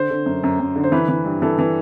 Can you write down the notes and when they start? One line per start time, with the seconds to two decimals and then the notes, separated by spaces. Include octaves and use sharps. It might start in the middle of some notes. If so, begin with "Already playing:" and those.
Already playing: D3 C5
0.10 D3
0.26 F#2
0.44 F#2
0.60 F#2
0.75 D3
0.84 C5
0.92 E3 B4
1.08 E3
1.25 G2
1.42 E3 A4
1.59 E3